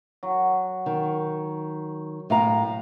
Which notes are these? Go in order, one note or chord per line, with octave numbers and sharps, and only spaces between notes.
F#3
D#3
A2 F5 A#5